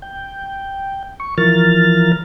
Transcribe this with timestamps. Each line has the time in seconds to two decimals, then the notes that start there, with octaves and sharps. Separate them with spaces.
0.02 G5
1.20 C#6
1.38 E3 F3 A#4 F6 A6